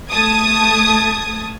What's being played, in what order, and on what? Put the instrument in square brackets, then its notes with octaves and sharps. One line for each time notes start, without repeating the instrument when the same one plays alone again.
[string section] A3 A5 D#6 G#6